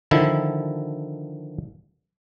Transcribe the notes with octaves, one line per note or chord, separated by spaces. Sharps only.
D3 D#3 F3 E4